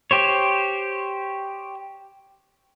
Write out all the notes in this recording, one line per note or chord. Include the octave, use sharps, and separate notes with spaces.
G4 C5 C#5